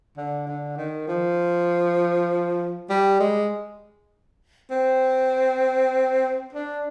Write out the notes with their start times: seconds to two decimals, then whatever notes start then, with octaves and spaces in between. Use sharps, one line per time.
0.17 D3
0.47 D3
0.77 D#3
1.08 F3
2.89 G3
3.20 G#3
4.70 C4
6.53 D4